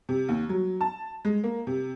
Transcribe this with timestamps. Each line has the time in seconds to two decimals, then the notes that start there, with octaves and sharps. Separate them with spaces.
0.09 C3
0.29 D#2
0.49 F#3
0.81 A5
1.25 G#3
1.44 A#3
1.67 C3